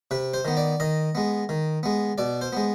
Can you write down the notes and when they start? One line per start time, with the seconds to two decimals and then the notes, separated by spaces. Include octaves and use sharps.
0.11 C3 B4
0.34 C5
0.45 D#3 B3
0.57 D5
0.80 D#3 D#5
1.15 G#3 B3
1.49 D#3
1.83 G#3 B3
2.18 B2 D5
2.41 C5
2.53 G#3 B3